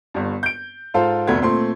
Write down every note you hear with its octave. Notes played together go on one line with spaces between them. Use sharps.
G1 G2
G6 D7
G#2 F4 A4 C5 F5
F1 D2 A3 B3 G#6
A#2 A3 C4 C6